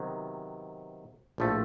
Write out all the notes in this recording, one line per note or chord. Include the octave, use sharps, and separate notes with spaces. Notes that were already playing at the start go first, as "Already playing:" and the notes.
Already playing: C3 D#3 F#3 B3
A#1 A2 F3 A3